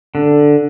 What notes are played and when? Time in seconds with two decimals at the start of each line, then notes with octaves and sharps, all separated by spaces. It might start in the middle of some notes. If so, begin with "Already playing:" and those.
0.15 D3